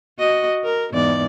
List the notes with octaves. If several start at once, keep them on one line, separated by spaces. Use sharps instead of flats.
F#4 D#5
A#4
E2 G#2 D5